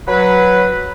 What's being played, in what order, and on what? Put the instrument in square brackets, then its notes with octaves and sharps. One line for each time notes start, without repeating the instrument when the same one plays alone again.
[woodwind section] F#3 B4